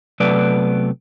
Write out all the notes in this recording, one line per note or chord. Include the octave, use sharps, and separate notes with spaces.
C3 F#3 A3 B3 B4 D5